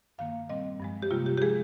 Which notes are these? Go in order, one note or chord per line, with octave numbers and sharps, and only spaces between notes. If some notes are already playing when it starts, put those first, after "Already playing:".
G2 D#3 A#3 F5
A#2 G3 C4 D#5
G2 F3 G#3
G4
C3 G3 A#3 F4
G4
G4
F3 G#3 G#4